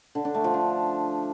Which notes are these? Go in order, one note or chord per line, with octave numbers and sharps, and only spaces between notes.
D3
D4
A3
F3
D4